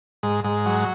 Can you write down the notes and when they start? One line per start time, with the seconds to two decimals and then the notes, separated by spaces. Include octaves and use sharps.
0.23 G#2
0.44 G#2
0.66 F#3